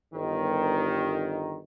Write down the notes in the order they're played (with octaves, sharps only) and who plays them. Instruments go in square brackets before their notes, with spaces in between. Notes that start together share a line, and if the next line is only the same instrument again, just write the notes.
[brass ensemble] G1 D#3